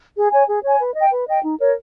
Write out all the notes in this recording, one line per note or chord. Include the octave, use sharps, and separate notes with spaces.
G#4
C#5 G#5
G#4
C#5
G#5
B4
D#5 G5
B4
D#5 G5
D#4
A#4 C#5